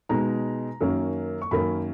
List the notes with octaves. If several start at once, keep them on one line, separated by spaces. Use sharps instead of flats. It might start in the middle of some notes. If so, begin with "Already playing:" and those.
B2 G#3 D#4 A#5
F#2 D#3 A#3 C#4
C#6
F#2 D#3 A#3 C#4 B5